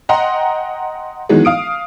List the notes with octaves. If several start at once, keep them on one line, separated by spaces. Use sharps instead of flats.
D#5 F#5 G5 A#5 C6
D#3 E3 F#3 G#3 B3
F5 D#6 D7